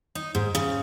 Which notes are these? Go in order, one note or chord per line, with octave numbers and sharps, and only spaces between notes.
D#4
G#2
C#3